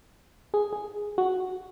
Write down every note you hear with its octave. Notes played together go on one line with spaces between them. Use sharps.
G#4
G#4
F#4